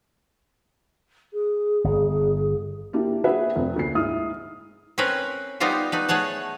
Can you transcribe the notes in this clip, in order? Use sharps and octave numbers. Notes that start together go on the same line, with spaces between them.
G#4
G1
A#3 D4 E4 G4
G#4 B4 E5 F#5
F1 C4
D2 A#3 C7
G#2 E4 D#6 F6
C4 C#4 A#4 B4
G3 B3 D#4 F4 G4 C5
A3 D#4 B4
A3 G#4 C#5 F#5 A5